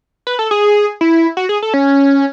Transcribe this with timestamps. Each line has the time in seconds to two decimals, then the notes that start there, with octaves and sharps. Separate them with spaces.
0.27 B4
0.39 A4
0.51 G#4
1.01 E4
1.37 F#4
1.49 G#4
1.62 A4
1.74 C#4